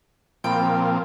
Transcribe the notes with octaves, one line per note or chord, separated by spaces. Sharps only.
A#2 F3 C4 G5 B5